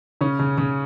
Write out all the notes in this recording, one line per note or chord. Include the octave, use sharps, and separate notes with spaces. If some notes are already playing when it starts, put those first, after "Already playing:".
C#3 C#4
C#3
C#3